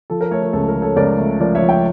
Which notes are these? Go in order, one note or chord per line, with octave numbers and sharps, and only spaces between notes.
F3 A4
A#4
A3 A4 C#5
A#4
C#2 A4
A#4
F3
A4 C#5
C#2 A#4 D5
A3
F3 A#4 D5
C#5 E5
F3
E5 G5